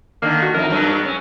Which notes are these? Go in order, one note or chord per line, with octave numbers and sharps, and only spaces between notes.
D3 D#3 A#3
F#4
F2 A2 D#4 A#4
G2 F#3 B3
C#4